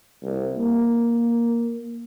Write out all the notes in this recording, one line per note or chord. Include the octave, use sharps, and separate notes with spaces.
C2
A#3